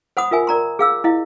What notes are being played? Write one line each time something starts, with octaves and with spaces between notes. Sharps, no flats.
C5 F#5 B5 D#6
F4 A#4 E5 G#5
A#4 D5 A#5 C6
G#4 F5 E6
E4 D#5 F5